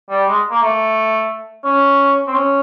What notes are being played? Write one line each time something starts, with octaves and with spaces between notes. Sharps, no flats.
G3
G#3
A#3
A3
C#4
C4
C#4